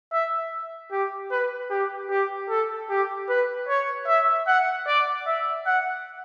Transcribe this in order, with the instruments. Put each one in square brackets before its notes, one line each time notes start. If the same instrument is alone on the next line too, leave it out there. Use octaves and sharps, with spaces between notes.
[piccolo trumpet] E5
G4
B4
G4
G4
A4
G4
B4
C#5
E5
F#5
D5
E5
F#5